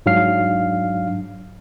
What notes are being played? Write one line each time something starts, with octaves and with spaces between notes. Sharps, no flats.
G#2 F#3 D4 F5 F6 C7